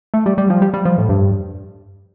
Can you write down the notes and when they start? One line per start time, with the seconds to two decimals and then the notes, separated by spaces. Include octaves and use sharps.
0.14 A3
0.26 G3
0.38 G3
0.50 F3
0.62 G3
0.74 G3
0.85 F3
0.98 A2
1.09 G2